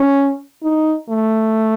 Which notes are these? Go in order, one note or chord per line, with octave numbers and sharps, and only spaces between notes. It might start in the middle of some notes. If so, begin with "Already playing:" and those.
Already playing: C#4
D#4
A3